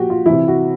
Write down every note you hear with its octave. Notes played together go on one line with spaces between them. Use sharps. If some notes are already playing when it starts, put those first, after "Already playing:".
Already playing: A#2 F3 F#4 G4
F4
C3 E3 E4
F#4